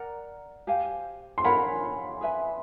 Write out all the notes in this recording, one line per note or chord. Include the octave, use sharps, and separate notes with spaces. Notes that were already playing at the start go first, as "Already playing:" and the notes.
Already playing: A#4 D5 F#5 A#5
G4 C5 F5 G#5
C6
A#4 C#5 F#5 A#5 B5
G#4 B4 E5 G#5